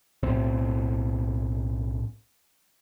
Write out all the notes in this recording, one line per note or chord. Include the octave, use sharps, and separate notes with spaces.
B1 A2 C4